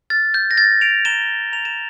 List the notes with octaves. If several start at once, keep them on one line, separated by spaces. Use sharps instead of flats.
F6 A6
G6
A#6
F6 A6
D7 F7
A#5 E7 G7
A#5 F7
E7